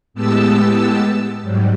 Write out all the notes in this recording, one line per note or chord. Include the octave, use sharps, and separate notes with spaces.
A2 G#3 B3 G4 A5 E6
G#2 F#3 G3